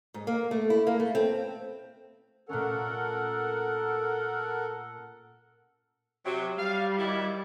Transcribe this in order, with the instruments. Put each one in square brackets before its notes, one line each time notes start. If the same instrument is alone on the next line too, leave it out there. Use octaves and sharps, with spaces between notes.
[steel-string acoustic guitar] G#2
A#3
A3
E4
A#3
A3
C4
[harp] A#2 A3 C#4 [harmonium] A4 A#4 F#5
[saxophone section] C3 F#3
[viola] G3 [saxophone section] F5
[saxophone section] D#3 F#3 E4